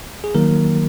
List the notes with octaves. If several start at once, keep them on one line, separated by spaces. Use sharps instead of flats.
G#4
D#3 F#3 A#3 A#4